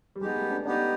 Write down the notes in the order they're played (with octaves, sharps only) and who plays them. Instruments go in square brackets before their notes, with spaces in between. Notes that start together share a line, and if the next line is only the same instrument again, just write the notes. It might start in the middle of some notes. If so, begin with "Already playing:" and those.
[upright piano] G3
[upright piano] G#3 [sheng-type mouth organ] B3 D#4 G4
[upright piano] A3
D4
[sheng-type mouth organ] B3 D#4 G4 [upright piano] D4